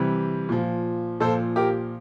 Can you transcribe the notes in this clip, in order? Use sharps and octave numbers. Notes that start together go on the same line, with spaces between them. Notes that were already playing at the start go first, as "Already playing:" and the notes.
Already playing: C3 E3 G3
A#2 F3
A#2 F3 A4 C5
G4 A#4